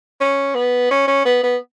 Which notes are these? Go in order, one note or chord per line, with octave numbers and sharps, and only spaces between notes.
C#4
B3
C#4
C#4
B3
B3